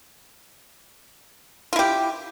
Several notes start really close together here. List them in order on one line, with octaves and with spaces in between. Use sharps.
F4 E4 G4